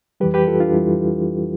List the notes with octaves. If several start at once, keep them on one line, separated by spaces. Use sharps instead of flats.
F2 E3 G3 G4 B4
G4 B4
F4 A4
D4 F4
F2 E3 G3 E4